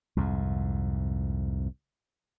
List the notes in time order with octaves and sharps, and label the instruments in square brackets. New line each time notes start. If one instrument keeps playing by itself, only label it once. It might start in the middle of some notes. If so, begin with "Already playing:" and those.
[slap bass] C2 F2 G#2